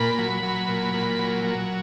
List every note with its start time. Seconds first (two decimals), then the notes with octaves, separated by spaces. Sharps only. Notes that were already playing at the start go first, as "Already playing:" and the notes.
Already playing: A#2 B5
0.18 F#3
0.43 F#3
0.68 A#2
0.94 A#2
1.19 F#3
1.44 F#3